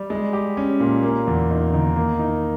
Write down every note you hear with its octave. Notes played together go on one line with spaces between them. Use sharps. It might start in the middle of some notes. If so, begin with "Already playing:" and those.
Already playing: G3
G#3
G4
C#4
A#2
A#3
E2
D#4
D#3
A#3
D#4